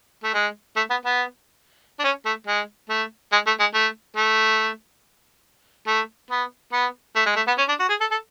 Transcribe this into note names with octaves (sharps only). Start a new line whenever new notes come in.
A3
G#3
A3
B3
B3
D4
C#4
A3
G#3
A3
G#3
A3
G#3
A3
A3
A3
B3
B3
A3
G#3
A3
B3
C#4
D4
F#4
G#4
A4
A4